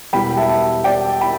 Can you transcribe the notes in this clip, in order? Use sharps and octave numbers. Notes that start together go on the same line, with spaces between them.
E1 E2 B2 G3 B3 G5 B5
E5 A5
D5 G5
G5 B5